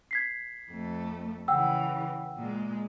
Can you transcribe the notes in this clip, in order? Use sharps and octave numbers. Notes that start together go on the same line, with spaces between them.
G#6 B6 C7
F2 A3
C#3 E3 F#5 G5 E6
A#2 G#3